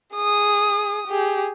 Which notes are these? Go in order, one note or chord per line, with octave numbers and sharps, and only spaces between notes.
G#4 D#6
G4 G#4